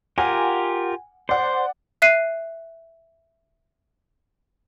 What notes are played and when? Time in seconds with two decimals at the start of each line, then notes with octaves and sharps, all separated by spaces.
0.18 F4 G4 A#4 F#5 G#5
1.29 C5 D5 F#5
2.02 E5 F#6 C7 D#7